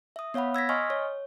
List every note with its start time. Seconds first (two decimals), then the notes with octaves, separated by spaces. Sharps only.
0.16 E5 D#6
0.34 B3 C#5 F5 F#5 B5
0.54 E6 G#6 A#6 B6
0.69 D#5 G#5 C6 C#6 D#6 F6
0.90 C#5